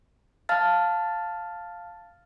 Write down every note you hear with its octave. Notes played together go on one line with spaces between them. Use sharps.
F5 A5 F6 A6